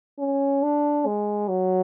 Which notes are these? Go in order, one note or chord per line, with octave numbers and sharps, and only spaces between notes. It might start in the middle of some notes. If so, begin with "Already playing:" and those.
C#4
D4
G#3
F#3